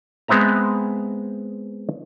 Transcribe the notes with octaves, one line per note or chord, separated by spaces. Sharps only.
G#3 B3 C4 E5 A#5